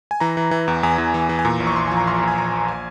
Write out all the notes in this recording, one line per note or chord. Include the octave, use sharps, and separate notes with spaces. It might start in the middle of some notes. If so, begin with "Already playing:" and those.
G#5
E3 A#5
E3
E3
E2
E2 G#5
E2
E3
E3
G#5
A#2 A#5
A#1
C#6
A#1 C6
F3 G#5
A#5
A#1 C6
A#2
G#5
A#1 A#5
A#1
G#5